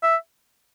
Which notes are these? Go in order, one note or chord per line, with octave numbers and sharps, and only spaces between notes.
E5